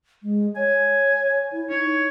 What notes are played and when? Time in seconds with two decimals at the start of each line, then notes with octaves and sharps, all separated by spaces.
0.23 G#3
0.56 C#5 G#5
1.52 E4
1.70 D#4 C#5